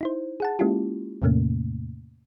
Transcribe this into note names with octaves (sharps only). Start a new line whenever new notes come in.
D#4 E4 C5
G#4 F#5 A5
G#3 A#3 C#4 E4 F4 G4
E2 A2 C3 A3 A#3 C#4